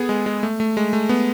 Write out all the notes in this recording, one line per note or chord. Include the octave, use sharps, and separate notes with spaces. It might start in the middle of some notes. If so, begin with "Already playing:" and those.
Already playing: B3 G#4 A4
G#3
G#3
A3
A3
G#3
A3
B3